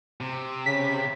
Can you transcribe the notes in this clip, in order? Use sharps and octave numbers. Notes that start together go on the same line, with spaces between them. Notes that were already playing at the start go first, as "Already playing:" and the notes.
C3
C#3 B6